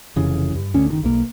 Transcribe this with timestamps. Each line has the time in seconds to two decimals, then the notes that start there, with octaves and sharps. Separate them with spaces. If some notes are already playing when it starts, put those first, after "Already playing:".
0.16 F1 C#3 E3
0.55 G2
0.74 D2 C#4
0.88 G1 D3 D#3
1.03 B1 B2 A#3